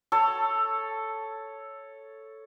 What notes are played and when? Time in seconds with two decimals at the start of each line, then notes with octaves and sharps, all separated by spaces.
0.12 A4 C#5